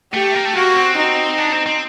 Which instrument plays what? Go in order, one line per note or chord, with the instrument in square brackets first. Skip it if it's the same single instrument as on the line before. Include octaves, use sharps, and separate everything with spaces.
[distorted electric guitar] A3 [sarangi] G4
[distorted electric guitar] A#3
A3
[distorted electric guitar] A#3 [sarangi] F#4
[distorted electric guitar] C4
[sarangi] D#4
[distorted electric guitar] D4
C4
C4